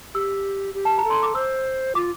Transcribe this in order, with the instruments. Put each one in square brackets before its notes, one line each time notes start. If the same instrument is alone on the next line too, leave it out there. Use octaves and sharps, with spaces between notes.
[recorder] G4 [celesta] E6
[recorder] G4
[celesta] A5
A#5
[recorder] A4
[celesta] C6
D6
[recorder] C5 [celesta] E6
[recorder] F4 [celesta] D6